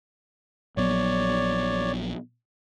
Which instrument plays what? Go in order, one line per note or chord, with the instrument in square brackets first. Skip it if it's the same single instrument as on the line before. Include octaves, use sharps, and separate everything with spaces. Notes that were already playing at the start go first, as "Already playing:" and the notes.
[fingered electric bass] A#1 F#3 B3 [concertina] C#5 D5